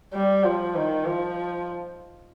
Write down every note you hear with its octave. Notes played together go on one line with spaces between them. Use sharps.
G3
F3
D#3
F3